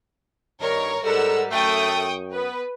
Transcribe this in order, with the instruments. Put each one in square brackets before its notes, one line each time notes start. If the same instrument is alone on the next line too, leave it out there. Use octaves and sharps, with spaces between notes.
[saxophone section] G2 D#3 [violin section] A#4 C#5
[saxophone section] G#2 G3 [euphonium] A4 [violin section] A#4 F#5 E6
[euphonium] F#2 [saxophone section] A3 [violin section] G5 C#6 D#6
[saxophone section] B3 [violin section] B4